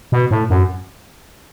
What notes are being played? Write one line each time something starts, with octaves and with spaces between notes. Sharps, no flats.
B2
A2
F#2